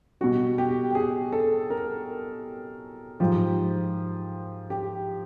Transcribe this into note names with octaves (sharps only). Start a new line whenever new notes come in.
B2 G3 F#4
G4
G4
G#4
A4
A#4
G#2 F3 G4
G4